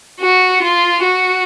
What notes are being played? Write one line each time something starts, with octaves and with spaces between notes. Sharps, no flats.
F#4
F4
F#4